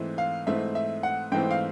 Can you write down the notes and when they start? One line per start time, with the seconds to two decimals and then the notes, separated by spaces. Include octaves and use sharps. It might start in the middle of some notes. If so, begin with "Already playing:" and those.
Already playing: G#2 E3 A3 C4
0.18 F5
0.46 G#2 E3 A3 C4 E5
0.75 E5
1.03 F#5
1.32 G#2 E3 A3 C4 G5
1.51 F5